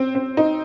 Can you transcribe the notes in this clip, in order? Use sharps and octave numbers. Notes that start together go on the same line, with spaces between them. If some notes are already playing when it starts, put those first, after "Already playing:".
Already playing: C4
C4
D#4